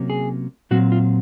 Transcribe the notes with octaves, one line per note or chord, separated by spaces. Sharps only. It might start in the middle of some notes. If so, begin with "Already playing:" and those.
Already playing: C3 F#3 A#3 C#4
G#4
A#2 F#3 C4 F#4
F4